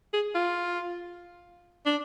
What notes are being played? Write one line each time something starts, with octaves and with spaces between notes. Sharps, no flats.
G#4
F4
D4